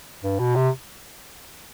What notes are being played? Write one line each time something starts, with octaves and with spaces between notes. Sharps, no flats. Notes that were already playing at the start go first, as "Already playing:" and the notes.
G2
B2
C3